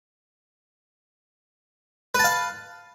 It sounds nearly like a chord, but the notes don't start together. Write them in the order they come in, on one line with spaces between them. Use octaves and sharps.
B4 A5 F5